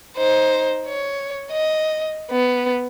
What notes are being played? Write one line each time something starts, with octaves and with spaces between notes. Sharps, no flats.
D#4 C5
C#5
D#5
B3